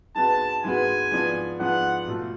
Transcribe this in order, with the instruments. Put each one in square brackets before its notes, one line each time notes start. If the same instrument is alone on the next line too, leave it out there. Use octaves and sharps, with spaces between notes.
[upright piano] G#2 G#3 B3 F#4 B4 [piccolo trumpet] A5
[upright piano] G#2 G#3 B3 F#4 B4 [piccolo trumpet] G#5
[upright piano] G#2 F3 B3 D4
[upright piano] G#2 F3 B3 D4 [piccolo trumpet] F#5
[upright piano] B2 A3 F4 A4